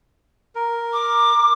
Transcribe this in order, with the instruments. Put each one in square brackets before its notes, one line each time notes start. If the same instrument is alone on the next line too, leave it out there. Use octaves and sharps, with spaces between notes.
[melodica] A#4
[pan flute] D6